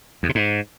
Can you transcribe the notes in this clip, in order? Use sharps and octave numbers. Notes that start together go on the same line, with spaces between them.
E2
C3
G#2